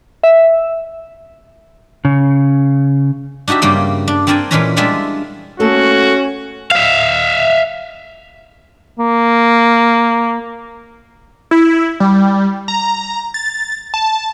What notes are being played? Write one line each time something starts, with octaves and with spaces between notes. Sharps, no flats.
E5
C#3
D4 D#4 F#4 G4 E5
G2 C#3 G3 A#3 D5 G5
D4
C4 D4 A#4 D5 G5 G#5
A#2 E3 G#3 C#4 B4 A#5
G3 G#3 D4 E4 F4 E5
A3 A#3 C#4 F#4 A4
E5 F5
A#3
E4
G3
A#5
A6
A5